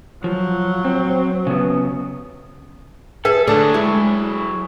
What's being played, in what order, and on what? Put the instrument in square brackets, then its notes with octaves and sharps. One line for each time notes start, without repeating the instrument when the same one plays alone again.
[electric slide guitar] F3 [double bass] F#3
[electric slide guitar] C4
C#3 B3
[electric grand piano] G#4 [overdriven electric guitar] A4 [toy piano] B4 [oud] E5
[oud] D3 [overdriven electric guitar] F#3 G#4 [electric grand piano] A3 D4 A5
[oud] G#3 [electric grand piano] E4